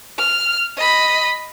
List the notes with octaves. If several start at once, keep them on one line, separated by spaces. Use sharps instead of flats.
F6
D#5 B5